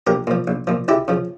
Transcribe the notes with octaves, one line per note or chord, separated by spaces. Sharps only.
A#1 G4 A#4
A#2 F3
A#1
A#2 F3
C#2 E4 G4
C#3 F3